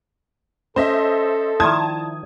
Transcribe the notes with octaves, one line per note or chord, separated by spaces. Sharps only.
C#4 A4 C5 D#5 E5
D#3 F3 E4 D5 A5 D#6 G#6